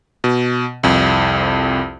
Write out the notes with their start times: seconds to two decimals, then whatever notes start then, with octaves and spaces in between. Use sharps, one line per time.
0.24 B2
0.83 C2 F2